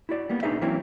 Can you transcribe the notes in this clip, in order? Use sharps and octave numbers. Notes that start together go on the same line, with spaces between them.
E4 F#4 D5
G3 A#3 B3
B1 D4 D#4 G#4 B4 E5
E3 F#3 A#3 C4 C#4 E4